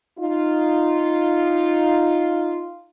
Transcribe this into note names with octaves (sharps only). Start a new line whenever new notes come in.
D#4 F4